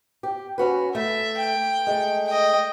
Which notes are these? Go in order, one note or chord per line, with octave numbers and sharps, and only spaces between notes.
G4
C#4 F#4 B4
A3 E5
G5
G#3 A3
D#5 G5